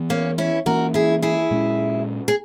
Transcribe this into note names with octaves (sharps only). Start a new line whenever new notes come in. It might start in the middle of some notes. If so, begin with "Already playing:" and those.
Already playing: E3 B3
A#3 C#4
C#4 E4
E3 A#3 C#4 F#4 A#4
E4 G#4
E4 G#4
A#2 G#3 C#4
G#4